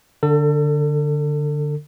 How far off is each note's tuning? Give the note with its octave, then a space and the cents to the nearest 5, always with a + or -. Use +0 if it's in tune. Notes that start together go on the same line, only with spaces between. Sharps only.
D3 +0 A4 +35